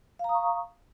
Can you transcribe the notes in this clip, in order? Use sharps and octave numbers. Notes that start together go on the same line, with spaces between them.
F5 A#5 C#6 D#6